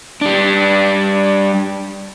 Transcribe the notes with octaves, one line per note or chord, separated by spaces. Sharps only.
G3 D4